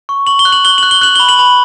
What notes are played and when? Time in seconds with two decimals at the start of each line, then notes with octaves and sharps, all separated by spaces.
0.09 C#6
0.27 C#6 F#7
0.39 G7
0.45 F#6
0.52 F#7
0.65 F#6 G7
0.78 F#6 F#7
0.91 G7
1.01 F#6 F#7
1.15 B5 G7
1.29 F#7
1.39 B5